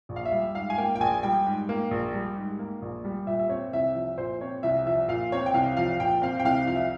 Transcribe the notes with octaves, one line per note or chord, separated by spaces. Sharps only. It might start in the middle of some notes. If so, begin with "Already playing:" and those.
A#1
F5
E5
G3
G#2 F5
G#5
A#3 G5
G5
A#1 G#5
G3 G5
G#2
A#3
A#1
G3
G#2
A#3
A#1
G3
A#2 E5
E5
C4 C#5
C2 E5
F3 E5
A#2 C5
C4 C#5
C2 E5
F3 E5
A#2 F5
C4 C#5
G5
C2 F5
F3 F5
A#2 G5
C4 F5
G5
C2 F5
F3 F5
E5